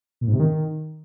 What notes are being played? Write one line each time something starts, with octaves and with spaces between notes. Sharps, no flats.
A#2
G#2
C3
D#3